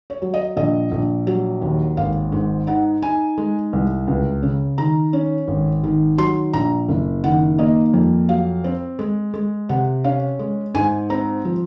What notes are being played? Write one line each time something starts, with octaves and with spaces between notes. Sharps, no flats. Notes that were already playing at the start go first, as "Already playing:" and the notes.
C#5
F#3
D#5
A#1 D#5
A#1
F#3
D#2
G#1 F5
G#2
D#4 F#5
D#4 G#5
G#3
C2
C#2
C#3
D#3 A#5
C#4
G#1
D#3
F#3 C6
A#1 A#5
F#1
D#3 F#5
A#3 D#5
F2
F#3 F5
C4
G#3
G#3
C3 F#5
C#4 F5
G#3
G#2 G#5
C4 A#5
F3